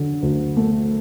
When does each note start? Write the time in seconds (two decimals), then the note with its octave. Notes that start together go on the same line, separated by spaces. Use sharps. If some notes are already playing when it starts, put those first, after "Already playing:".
Already playing: D3 F#3
0.22 D2
0.56 A3